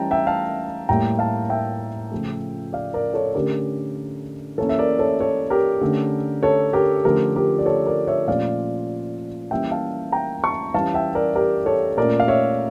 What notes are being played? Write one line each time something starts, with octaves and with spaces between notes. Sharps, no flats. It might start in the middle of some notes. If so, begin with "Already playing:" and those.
Already playing: E3 G3 C#4 G5 A5 A#5
E5 G5
F5 A5
A2 G3 A#3 G5 A#5
F5 A5
E5 G5
C#3 F3 A3
D5 F5
A#4 D5
A4 C#5
D3 A3 C#4 G4 A#4
E3 A#3 C#4 A4 C#5
E5
A#4 D5
A4 C#5
A4 C#5
G4 A#4
D3 A3 C#4
A4 C#5
G4 A#4
D3 F3 A3 C#4 G4 A#4
G4 A#4
D5
A4 C#5
A#4 D5
C#5 E5
A#2 F3 A3 C#4 D5 F5
E3 G3 A#3 C#4 E5 G5
F5 A5
G5 A#5
A5 C#6
E3 G3 C#4 F5 A5
E5 G5
A#4 D5
G4 A#4
A4 C#5
A#2 A3 C#4 A#4 D5
F5
C#5 E5